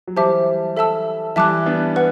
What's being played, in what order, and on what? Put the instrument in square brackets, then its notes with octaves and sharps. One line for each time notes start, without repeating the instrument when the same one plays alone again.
[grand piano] F#3
[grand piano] E3 G3 [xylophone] G4 C5 E5 A5 D6
[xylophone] A4 E5 A5 E6
[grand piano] E3 G3 [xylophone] E5 A5 D6 F#6
[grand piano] B3 D4
[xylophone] B4 F#5